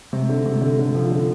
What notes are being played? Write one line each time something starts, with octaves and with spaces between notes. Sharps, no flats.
C3
D3
C3
D3
D3
F3
D3